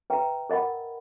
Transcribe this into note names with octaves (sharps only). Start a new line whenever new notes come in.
B4 E5 G5 A#5
A#4 D#5 F#5 B5